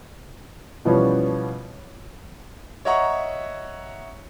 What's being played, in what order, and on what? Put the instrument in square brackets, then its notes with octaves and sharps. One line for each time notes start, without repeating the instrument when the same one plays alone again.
[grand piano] B2 E3 F3 G3 B3 C#4
C#5 D#5 E5 F#5 A#5 C#6